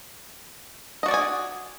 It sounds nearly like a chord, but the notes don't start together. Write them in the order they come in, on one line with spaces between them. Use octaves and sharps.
D#5 F#4 D5 G#4 G#5